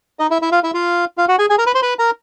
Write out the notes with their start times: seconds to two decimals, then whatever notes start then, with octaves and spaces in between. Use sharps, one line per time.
0.19 D#4 D#5
0.30 E4 E5
0.42 E4 E5
0.52 F4 F5
0.63 E4 E5
0.74 F4 F5
1.18 F4 F5
1.28 F#4 F#5
1.39 G#4 G#5
1.50 G#4 G#5
1.58 A#4 A#5
1.66 B4 B5
1.75 C5 C6
1.82 B4 B5
1.99 A#4 A#5